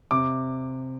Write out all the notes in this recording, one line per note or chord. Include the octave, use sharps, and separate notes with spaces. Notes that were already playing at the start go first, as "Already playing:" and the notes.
C3 D6